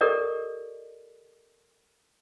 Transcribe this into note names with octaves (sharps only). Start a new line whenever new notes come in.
G4 A4 A#4 D5 D#5